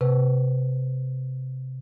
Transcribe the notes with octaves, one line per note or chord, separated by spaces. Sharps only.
C3 B4